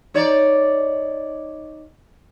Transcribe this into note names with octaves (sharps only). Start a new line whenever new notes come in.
D#4 C#5 D5